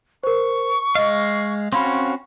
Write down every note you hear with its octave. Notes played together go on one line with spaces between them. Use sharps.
A#4 C5 C#6
G#3 D#5 F5
C4 C#4 F#4 F5 B5 C6